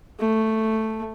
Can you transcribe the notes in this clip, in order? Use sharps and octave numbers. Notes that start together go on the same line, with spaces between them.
A3